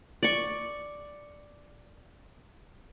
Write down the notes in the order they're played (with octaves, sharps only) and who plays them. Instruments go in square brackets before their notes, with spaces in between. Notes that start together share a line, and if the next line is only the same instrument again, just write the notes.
[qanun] D5 C#6